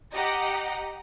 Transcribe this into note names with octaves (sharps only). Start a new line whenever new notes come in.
G4 D#5 F#5 A#5